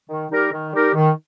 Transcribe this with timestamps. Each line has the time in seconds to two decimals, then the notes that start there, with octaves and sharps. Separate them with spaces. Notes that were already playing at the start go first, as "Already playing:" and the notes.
0.10 D#3
0.31 G3 D#4 G4 A#4
0.52 D#3
0.73 G3 D#4 G4 A#4
0.94 D#3